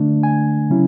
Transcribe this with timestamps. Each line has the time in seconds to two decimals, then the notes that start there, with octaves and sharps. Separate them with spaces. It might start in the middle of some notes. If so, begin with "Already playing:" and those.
Already playing: D3 A3 D4
0.23 G#5
0.70 C#3 F#3 C#4 E4